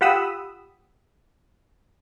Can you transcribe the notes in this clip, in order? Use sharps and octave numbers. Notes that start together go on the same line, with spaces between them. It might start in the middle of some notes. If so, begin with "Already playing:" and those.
F4 G4 F#5 B5 D#6 E6